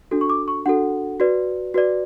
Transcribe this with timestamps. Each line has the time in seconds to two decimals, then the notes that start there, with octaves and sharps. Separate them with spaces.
0.11 D4 F#4 A4
0.21 C#6
0.30 D6
0.48 C#6
0.66 D4 F#4 A4 F#5
1.20 F#4 B4 D5
1.74 F#4 B4 D5